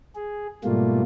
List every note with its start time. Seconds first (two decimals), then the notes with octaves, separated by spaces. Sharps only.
0.16 G#4
0.64 G#2 B2 G3 A3 A#3 F4